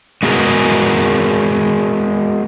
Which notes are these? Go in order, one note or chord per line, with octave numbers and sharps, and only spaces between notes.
G#3 B3 F#4 G#4 A#4 B4